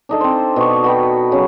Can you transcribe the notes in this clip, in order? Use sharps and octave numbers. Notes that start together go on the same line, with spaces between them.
D4 D#4 A4
C4 C5
B2 C#6
F#4 B4 G5
C#3 F#3